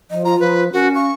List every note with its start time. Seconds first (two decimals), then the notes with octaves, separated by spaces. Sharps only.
0.10 F3 D#5
0.25 F4 A#5
0.40 F3 B4
0.73 C#4 F#4 A#4
0.95 F5 C#6